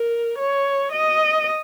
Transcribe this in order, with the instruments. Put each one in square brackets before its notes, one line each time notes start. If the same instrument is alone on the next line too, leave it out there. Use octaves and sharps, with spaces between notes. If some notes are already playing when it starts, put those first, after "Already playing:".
Already playing: [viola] A#4
C#5
D#5